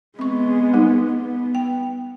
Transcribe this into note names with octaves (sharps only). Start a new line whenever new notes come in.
G#3 B3 C4 C#6
G3 D#4
B3
G5